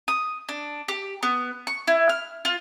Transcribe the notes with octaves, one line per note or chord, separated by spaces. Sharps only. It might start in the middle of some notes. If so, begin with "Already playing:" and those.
D#6
D4
G4
B3
C#6
E4
F6
F4